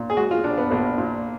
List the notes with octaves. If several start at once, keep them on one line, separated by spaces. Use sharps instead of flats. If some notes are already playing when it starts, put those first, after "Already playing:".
Already playing: A#2
G#4
G#3 F#4
F4
A#1 D4
B3
A#1 A#3
A#2